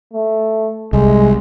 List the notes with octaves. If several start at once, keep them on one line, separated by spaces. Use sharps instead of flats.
A3
C2 G#3